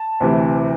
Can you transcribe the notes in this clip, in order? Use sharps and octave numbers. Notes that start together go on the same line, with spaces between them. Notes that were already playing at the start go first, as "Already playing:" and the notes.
Already playing: A5
D2 C3 E3